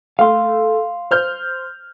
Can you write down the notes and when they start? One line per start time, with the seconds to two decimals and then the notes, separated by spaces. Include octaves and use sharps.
0.19 A3 F5 C6
1.11 C5 F6 G6